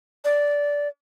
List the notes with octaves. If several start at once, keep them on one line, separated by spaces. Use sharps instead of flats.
D5